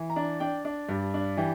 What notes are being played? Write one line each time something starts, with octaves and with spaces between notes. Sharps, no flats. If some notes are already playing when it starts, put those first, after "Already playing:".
Already playing: E3
A#5
D4
D4 G5
D4
G2
D4
E3 G4